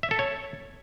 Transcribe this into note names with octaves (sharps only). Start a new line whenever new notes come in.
E5
A4
C#5